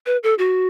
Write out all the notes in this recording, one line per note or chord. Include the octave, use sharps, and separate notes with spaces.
B4
A4
F#4